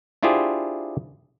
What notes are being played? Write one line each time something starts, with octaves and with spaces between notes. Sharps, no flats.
D4 E4 F4 G4 G#4 C5